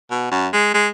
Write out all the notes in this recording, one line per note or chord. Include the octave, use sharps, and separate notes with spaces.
B2
F#2
G#3
G#3